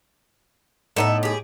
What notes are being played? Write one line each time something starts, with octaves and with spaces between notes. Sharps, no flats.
A2 B3 D#4 A4 D#5 E5
G4 G#4